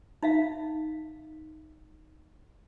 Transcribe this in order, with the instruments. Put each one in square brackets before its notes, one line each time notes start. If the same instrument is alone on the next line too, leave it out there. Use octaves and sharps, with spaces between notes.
[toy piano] D#4 E5 F5